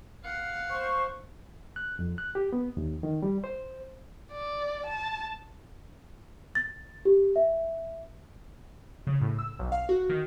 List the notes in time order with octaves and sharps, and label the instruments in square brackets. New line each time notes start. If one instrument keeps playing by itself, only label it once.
[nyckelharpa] F5 F#5
[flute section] C5 C#6
[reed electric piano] F#6
F2
F#6
G4
B3
D#2
D#3
G3
C5
[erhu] D5
A5
[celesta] A6
G4
E5
[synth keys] C#3
A2
E6
B1
F5
F#4
D#3